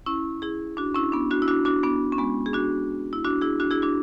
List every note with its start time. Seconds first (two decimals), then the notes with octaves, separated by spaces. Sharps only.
0.06 C#4 E4
0.42 E4 G#4
0.77 D4 F#4
0.95 C#4 E4
1.12 B3 D4
1.31 D4 F#4
1.42 E4
1.48 D4 F#4
1.65 D4 F#4
1.83 B3 D4
2.12 C#4
2.18 G#3 B3
2.46 G#4
2.53 D4 F#4
3.13 E4
3.24 D4 F#4
3.41 E4 G#4
3.60 D4 F#4
3.71 E4 G#4
3.82 D4 F#4